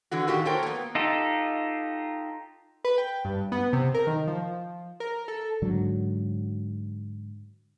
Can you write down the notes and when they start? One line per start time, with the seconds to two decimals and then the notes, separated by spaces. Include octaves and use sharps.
0.11 D3 E3 F#4
0.27 A#2 D#3 F#4 G4
0.45 F#4 A4 A#4 C5 C#5 G5
0.63 A#3 B3
0.95 D#4 F4 G4 A4
2.85 B4
2.98 G5
3.25 G2
3.52 B3
3.73 C3
3.94 A#4
4.07 D#3
4.27 F3
5.00 A#4
5.28 A4
5.62 G#2 D3 F#3